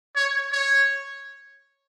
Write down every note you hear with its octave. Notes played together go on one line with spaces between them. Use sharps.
C#5
C#5